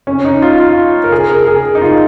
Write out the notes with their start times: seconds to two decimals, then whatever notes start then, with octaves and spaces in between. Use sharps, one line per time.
0.07 C#4
0.25 D#4
0.42 F4
0.60 F4
1.04 A#4
1.12 G#4
1.29 A#4
1.47 G#4
1.75 D#4
1.82 F4